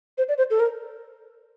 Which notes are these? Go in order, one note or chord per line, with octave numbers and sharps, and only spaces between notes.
C5
D5
C5
A4
A#4